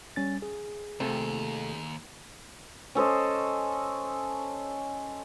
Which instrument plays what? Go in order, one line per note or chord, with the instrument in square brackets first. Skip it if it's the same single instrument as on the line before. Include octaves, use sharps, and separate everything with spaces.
[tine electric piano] G3 C#4 A6
G#4
[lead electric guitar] D#2 [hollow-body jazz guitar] C3 A3
[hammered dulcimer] C#4 A4 C5 D#5